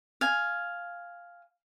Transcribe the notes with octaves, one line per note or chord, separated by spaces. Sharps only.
F5 G#5